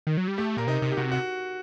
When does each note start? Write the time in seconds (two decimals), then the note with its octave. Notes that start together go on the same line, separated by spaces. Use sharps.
0.07 D#3
0.17 F#3
0.28 G3
0.38 A3 G4
0.57 A#2 A#4
0.67 C3 D#4
0.82 C3 D#4
0.92 G4
0.97 C3 F#4
1.12 F#4